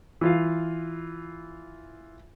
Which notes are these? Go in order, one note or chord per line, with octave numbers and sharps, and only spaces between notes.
E3 F4 F5